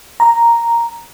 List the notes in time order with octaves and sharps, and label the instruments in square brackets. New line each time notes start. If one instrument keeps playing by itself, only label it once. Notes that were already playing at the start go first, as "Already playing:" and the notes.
[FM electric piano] A#5